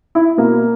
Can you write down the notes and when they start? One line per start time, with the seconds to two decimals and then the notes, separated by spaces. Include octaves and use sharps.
0.15 E4
0.37 B2 A#3